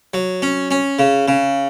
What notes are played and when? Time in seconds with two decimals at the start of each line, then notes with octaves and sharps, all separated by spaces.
0.14 F#3
0.42 C#4
0.71 C#4
0.99 C#3
1.28 C#3